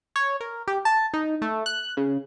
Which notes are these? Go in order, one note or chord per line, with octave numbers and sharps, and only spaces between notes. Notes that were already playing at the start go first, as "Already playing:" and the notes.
C#5
A#4
G4
A5
D#4
A3
F#6
C#3